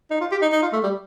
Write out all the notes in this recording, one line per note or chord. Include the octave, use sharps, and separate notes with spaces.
D#4
F4
G4
D#4
D#4
F4
A3
G3